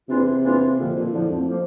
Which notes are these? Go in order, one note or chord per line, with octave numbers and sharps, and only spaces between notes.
E2 C3 E3 A#3 D4 F4
E2 E3 A#3 D4 F4
F2 A#2 D3 F3
A#2
F2 A2 D3 F3
F2
F3 A#3